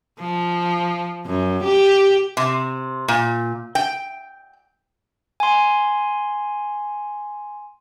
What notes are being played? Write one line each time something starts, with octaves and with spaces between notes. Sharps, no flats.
F3
F#2
G4
C3
A#2
G5
G#5 C6